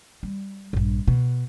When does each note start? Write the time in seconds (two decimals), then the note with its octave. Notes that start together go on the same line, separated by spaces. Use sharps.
0.23 G3
0.73 A#1 G2
1.08 B2